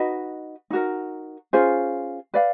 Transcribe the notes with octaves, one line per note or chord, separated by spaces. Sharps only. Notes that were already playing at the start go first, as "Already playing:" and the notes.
Already playing: D#4 F#4 B4 D#5
D#4 F#4 A#4
C#4 F4 G#4 C5
B4 D5 F5